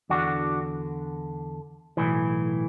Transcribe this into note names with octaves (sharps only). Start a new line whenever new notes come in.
E2 D3 D4 F#4
B1 A2 E3